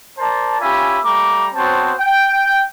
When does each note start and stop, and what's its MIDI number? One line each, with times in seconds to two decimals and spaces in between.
0.18 0.58 70
0.18 0.58 72
0.18 0.58 74
0.18 0.58 81
0.60 0.98 61
0.60 0.98 65
0.60 0.98 67
0.60 0.98 76
0.60 0.98 80
0.60 0.98 83
1.04 1.48 55
1.04 1.48 57
1.04 1.48 82
1.04 1.48 86
1.54 1.93 59
1.54 1.93 60
1.54 1.93 66
1.54 1.93 72
1.54 1.93 73
1.54 1.93 81
1.98 2.65 79